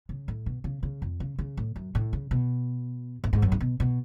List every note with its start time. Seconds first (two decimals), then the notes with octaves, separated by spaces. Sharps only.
0.09 C#3
0.28 A2
0.46 B2
0.64 C#3
0.83 C#3
1.02 F2
1.20 C#3
1.39 C#3
1.57 A2
1.76 F#2
1.95 A2
2.13 C#3
2.31 B2
3.24 A2
3.33 G#2
3.42 F#2
3.52 G#2
3.61 B2
3.80 B2